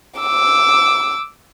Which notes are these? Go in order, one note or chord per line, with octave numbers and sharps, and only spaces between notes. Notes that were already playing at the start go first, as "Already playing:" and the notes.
D6 E6